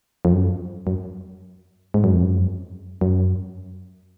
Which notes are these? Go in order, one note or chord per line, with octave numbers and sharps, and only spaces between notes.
F2
F#2
F#2
G#2
F#2
F2
F#2
F#2